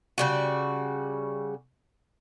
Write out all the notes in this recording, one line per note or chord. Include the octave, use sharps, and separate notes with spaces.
C#3 G3 F#4